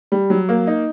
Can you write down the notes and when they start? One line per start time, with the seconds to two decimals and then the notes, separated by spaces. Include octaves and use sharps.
0.12 G3
0.30 F#3
0.49 A#3
0.67 D#4